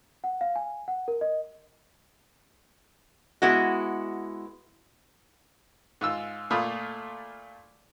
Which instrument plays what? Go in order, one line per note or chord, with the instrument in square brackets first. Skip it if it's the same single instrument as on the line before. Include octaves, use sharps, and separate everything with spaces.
[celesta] F#5
F5
G#5
F#5
A#4
D#5
[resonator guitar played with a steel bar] G#3 B3 E4 F#4
[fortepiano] G#2 F4 E6
A#2 A3 F4 B5 D#6